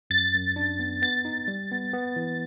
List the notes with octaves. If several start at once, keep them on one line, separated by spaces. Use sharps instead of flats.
F#2 A6
F#2
D4
B3
B3 A6
D#4
G3
B3
B3
E3